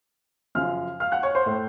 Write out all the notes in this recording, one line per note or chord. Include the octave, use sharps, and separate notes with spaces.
F#2 C#3 F3 F5 F6
F5 F6
F#5 F#6
C#5 C#6
C5 C6
A2 A3